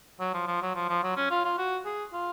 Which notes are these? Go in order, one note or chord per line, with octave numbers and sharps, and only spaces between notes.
F#3
F3
F3
F#3
F3
F3
F#3
C#4
F4
F4
F#4
G#4
F4